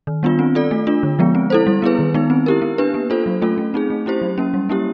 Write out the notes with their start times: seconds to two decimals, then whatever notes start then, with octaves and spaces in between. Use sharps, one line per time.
0.07 D#3
0.23 G3 B3 D4 F4
0.39 C4
0.55 F4 A4 D5
0.71 A3
0.87 D4 F4
1.03 D3
1.19 F3 G#3 B3
1.35 C4
1.50 E4 A4 C5
1.67 G3
1.82 B3 E4 G#4 B4
1.99 D#3
2.14 G#3 B3 D#4
2.30 C4
2.46 E4 G4 A#4
2.62 B3
2.78 D4 G4 B4
2.94 A#3
3.10 D4 F4 A4 C5
3.26 F#3
3.42 A3 C#4 F4 A4
3.58 A3
3.74 C4 D#4 G#4
3.90 A3
4.06 C#4 E4 G4 C5
4.22 F#3
4.38 A#3 C#4
4.54 G3
4.69 A#3 C#4 E4 G4